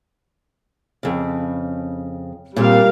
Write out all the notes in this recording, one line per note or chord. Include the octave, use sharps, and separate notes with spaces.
F2 C#3
A#2 G3 C4 A#4 F5